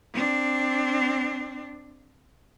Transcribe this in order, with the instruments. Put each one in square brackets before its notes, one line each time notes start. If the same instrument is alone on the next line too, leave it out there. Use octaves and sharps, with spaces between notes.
[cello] C4 D4